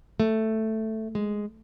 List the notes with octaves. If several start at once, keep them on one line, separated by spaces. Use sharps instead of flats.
A3
G#3